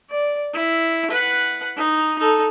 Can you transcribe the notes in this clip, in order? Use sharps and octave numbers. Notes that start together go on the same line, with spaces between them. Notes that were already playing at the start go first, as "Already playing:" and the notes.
D5
E4
B4 F#5
D#4
D#4 A4